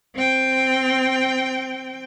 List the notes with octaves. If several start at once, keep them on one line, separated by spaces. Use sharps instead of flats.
C4 G5